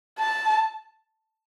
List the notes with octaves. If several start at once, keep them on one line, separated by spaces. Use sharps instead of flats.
A5